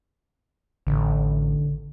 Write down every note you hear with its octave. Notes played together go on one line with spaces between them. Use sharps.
A1 D3